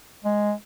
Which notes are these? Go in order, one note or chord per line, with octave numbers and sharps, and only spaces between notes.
G#3